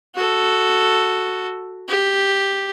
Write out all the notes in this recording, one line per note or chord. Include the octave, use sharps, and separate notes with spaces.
F#4 A4
G4